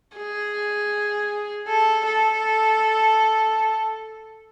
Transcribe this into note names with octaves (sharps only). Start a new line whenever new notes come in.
G#4
A4
A4